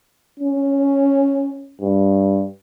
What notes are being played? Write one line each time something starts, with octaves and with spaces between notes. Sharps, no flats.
C#4
G2